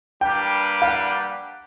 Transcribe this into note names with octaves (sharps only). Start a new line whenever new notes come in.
G3 A#3 D4 G4 B4 G5
F5
F#5